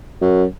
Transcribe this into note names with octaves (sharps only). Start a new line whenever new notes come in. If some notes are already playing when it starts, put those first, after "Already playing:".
F#2